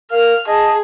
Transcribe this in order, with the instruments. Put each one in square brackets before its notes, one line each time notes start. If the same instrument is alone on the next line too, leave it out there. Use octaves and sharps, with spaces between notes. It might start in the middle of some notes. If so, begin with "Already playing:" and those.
[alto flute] A#4 [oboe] F5 [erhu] F6
[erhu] G#4 [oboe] D#5 [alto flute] A5